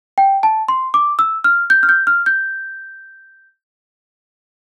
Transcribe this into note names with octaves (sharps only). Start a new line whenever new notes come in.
G5
A5
C6
D6
E6
F6
G6
F6
G6
F6
G6